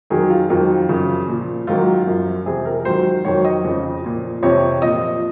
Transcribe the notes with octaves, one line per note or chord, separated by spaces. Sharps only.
F2 D#3 F#3 G#4
F4
F2 D#3 F#3 F4
F#2 C#3 F3
A#2 F3
G#2 D#3 F#3 F4
F#2 F3
F2 C3 F3 G#4
A#4
G#2 D#3 F#3 C5
F2 D#3 F#3 C#5
D#5
F2 C#3 F3
A#2 F3
F2 C3 F3 C#5
A#2 F3 D#5